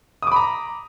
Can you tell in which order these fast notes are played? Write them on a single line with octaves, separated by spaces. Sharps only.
D#6 D6 B5 A#5